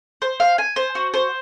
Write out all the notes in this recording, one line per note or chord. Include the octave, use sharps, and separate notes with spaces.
C5
F5
G#5
C5
F#4
C5